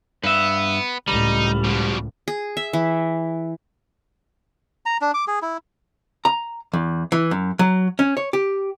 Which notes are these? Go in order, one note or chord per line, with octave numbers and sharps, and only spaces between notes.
G2 B3 E5
C#2 A2 G3 D#4
B2 F3
G#4
E5
E3
A#5
D4
D6
G#4
E4
A#5
E2
E3
F#2
F#3
C#4
C#5
G4